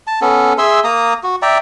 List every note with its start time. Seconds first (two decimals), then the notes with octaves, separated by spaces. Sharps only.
0.07 A5
0.22 B3 C#4 A4
0.58 G#4 E5 C6 E6
0.84 A#3 A#5 D#6
1.23 F#4
1.42 D5 E5 G5 A#5